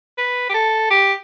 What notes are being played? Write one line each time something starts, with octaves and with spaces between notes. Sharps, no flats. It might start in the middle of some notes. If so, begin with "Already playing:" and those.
B4
G4
A4
G4